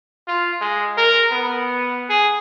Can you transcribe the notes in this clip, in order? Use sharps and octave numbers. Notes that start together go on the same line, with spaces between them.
F4
G#3
A#4
B3
G#4